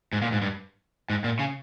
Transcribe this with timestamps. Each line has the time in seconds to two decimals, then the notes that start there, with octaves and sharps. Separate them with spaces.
0.13 G#2
0.22 A#2
0.32 G#2
0.42 G2
1.10 G#2
1.24 A#2
1.39 C#3